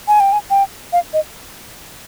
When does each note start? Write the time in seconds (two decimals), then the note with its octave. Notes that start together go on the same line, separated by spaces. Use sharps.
0.08 G#5
0.20 G5
0.33 G#5
0.50 G5
0.93 F5
1.13 D#5